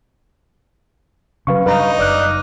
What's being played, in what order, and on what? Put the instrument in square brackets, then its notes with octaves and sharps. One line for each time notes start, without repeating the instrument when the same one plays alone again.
[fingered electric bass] C#3 F#3 [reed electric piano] B4 F5 C#6
[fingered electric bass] G2 [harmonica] D#4 [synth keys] B4 [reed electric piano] F5 A#5
[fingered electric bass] F#1 [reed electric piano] D5 [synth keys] D6 F6 F#6